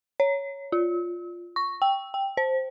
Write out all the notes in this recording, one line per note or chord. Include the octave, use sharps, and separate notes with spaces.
C#5
F4
C#6
G5
G5
C5